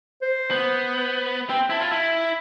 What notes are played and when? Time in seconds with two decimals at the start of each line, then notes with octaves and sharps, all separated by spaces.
0.22 C5
0.51 B3
0.65 C5
1.50 C4 G5
1.70 E4 A5
1.82 F4
1.92 E4